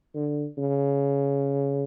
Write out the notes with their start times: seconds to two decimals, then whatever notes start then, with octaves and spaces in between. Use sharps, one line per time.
0.14 D3
0.58 C#3